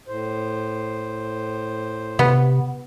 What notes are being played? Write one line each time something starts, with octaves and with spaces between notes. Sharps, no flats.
A2 C5
C3 B3